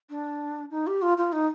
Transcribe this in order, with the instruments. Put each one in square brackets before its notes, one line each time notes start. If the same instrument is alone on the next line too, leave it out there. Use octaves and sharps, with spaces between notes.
[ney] D4
D#4
G4
F4
F4
D#4